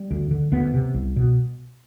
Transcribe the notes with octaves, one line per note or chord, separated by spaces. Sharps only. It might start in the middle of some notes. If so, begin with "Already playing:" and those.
Already playing: G3
D2
D3
D2 B3
C3
C2
B2